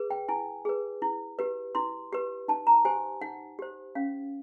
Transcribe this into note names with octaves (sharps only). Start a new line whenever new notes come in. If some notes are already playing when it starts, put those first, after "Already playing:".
Already playing: G#4 B4
G5
E4 G#5
G#4 B4
E4
G4 B4
E4 C6
G4 B4
D#4 A5
A#5
G4 C5 G#5
D#4 F#5
G4 C5
C#4 F5